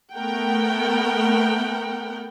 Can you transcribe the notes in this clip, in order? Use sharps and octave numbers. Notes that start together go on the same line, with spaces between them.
A3 B3 A#4 F#5 G5